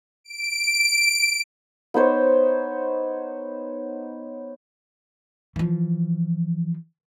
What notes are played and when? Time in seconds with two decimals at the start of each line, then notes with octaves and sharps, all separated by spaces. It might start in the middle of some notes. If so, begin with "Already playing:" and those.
0.24 D7
1.94 B3 D#4 C5 C#5
5.56 E3 F3